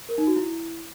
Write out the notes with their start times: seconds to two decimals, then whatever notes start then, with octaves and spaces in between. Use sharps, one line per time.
0.09 A#4
0.18 D#4
0.27 F#4
0.36 E4